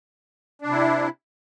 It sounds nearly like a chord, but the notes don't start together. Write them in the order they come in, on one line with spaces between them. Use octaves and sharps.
D4 C3 E4